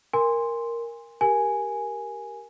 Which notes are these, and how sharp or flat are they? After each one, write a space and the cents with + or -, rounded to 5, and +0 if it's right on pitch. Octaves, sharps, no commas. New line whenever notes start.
A#4 +0 G#5 -30 C6 +0
G4 +0 A#4 +0 G#5 +0